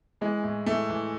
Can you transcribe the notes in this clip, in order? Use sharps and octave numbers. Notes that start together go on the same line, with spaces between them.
E3 G#3
A2
E3 A3
E3